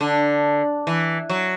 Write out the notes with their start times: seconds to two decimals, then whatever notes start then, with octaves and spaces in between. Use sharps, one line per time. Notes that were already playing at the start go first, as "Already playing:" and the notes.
0.01 D3
0.87 E3
1.30 F#3